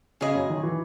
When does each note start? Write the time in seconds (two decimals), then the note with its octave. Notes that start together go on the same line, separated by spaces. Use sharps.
0.21 C#3 C#4 G#4 D#5 G#5
0.35 F#2 F#3
0.50 D#3
0.63 E3